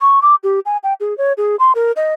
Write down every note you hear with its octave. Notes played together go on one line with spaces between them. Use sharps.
C#6
D6
G4
G#5
G5
G#4
C#5
G#4
C6
A#4
D#5